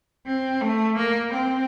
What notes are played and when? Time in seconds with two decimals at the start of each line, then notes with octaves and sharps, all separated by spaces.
0.26 C4
0.61 A3
0.97 A#3
1.33 C4